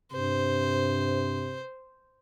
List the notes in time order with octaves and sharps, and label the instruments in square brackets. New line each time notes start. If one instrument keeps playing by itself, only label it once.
[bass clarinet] G2 [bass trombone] C3 [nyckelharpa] C5